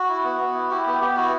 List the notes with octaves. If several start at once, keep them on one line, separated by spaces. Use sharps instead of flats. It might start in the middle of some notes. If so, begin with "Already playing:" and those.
Already playing: F#4
E4
B3
B3
E4
E4 G4
B3 G4
B3 G4
E4 F#4